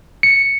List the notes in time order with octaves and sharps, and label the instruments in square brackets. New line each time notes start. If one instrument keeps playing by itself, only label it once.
[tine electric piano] C#7